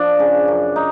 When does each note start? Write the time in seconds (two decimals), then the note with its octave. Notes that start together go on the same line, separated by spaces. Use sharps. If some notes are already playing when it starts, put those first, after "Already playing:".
Already playing: F3 D4
0.20 C#3
0.48 F#2
0.76 D#4